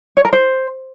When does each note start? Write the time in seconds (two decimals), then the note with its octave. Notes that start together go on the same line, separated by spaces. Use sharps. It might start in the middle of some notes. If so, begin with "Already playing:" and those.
0.17 C#5
0.25 A#4
0.33 C5